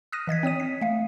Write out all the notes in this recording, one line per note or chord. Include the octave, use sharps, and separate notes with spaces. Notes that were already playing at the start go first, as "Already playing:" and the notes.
D#6 F6 F#6 A#6 D#7
E3 D#5 G#6 B6
C4 C#5 D#6 D#7
B6
A3 F5